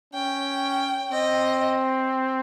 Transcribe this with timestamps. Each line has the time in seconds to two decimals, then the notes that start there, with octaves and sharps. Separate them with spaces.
0.13 C#4 G5
1.12 C4 D#5